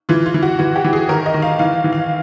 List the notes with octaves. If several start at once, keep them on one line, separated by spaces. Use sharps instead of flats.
E3 F4
F4
E3
F#4
E3 F#4
G4
E3
G#4
D#3 A#4
D#5
D#3
F5
E3 F5
E3
F5